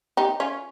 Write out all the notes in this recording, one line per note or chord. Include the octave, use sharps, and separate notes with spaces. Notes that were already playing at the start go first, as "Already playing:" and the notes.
D#4 G4
C#4 F4